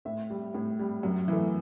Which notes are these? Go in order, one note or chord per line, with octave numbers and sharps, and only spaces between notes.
A2 E5
G3
A2
G3
F#2
E3 A3